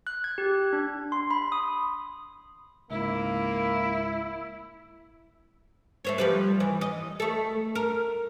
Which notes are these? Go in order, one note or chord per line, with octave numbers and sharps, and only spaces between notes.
F#6
G#6
G4
D4
C6
B5
D#6
C#2 G#2 A#3 E4
A3 C5 C#5
F3 G3 B4
E3
D#5
A3 A4
A#4